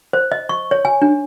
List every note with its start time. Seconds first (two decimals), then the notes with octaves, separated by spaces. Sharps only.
0.13 C5
0.32 D#5
0.49 C#6
0.71 C#5
0.85 G#5
1.02 D4